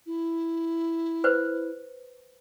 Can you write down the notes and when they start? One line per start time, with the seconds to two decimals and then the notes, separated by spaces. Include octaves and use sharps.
0.06 E4
1.24 B4 C5